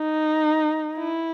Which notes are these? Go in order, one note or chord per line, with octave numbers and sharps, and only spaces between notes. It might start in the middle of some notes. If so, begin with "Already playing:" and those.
Already playing: D#4
E4